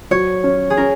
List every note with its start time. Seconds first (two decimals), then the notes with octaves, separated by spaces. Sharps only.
0.11 F#3 C#5
0.44 C#4
0.70 G#4
0.77 C#4 A#4